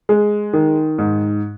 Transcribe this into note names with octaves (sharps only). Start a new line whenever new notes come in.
G#3
D#3
G#2